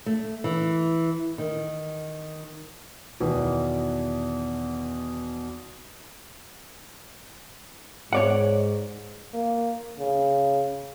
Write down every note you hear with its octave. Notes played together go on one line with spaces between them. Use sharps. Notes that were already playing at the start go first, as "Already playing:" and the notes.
A3
E3
D#3
E2 B2 D#3 E3
G#2 C#5 D5 F#5
A#3
C#3